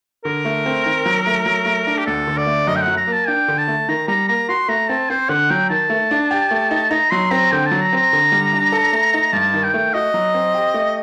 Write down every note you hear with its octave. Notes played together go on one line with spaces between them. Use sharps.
D3 A#4
A3
C4
D#3
F#3
A3
F#3
A3
D4
G4
D2 A4
D3
D5
A3
F#2 D#5
G5
F#5
F#3
A#5
A#3
A5
D4 G5
D3
A5
A3
D#3 A#5
G3 A#5
A#3 A#5
F#4 C6
A3 A#5
C4 A5
C4 C5
D3 F#5
F#3 G5
D#3 A5
A3
D4
G4
A3
D#4
D#4 A#5
F#3 C6
C4 A#5
D3 G5
A5
F#3
A#5
C4 A#5
D3
G3
D4
A4
A3
D#4
G2 A5
D#3
G5
A3
F#4 D#5
F#3
C4
G4
A3